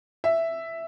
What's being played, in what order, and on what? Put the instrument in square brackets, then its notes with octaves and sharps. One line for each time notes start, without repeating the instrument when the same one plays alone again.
[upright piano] E5